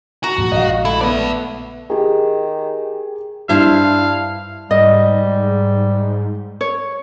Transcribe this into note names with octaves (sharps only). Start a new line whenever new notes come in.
F#4 A#5
G2 A#2 F3
A#1 A#2 G#3 D#5 F5
A3 E4
B3 D5 E5
D#3 G4 G#4
G2 D4 E4 C5 E5 F5
G#2 G3 D#5
C#5